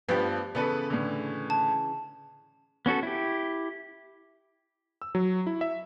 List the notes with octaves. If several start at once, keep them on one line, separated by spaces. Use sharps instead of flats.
G2 F3 B3 G4
C#3 E3 B3 A4 B4
A2 D3
A5
B3 C#4 F#4 A4
E4 G4
E6
F#3
E4
E5